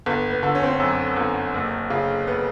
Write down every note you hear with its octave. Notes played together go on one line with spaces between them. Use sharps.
G1 B3
B3
D3
C#4
C4
C#4
F#2
G1
F#1
C#3
B3